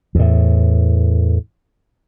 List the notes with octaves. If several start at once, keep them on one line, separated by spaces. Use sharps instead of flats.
E2 A2